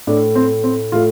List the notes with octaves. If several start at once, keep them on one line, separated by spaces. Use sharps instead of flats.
A2 A3 D4
C4
C4
A2 A3 F4